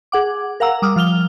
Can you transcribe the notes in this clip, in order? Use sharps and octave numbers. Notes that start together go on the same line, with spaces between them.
G#4 F#5 D6
A#4 F5 F#5 A#5 E6
G3 D6 D#6 F6
F3 F6 F7 G7